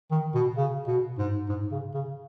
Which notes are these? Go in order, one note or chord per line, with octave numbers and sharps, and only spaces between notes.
D#3
B2
C#3
B2
G#2
G#2
C#3
C#3